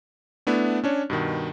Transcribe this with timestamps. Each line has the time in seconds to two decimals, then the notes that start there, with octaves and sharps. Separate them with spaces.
0.47 A3 B3 D4 E4
0.84 C#4 D4 C#5
1.10 G2 B2 D#3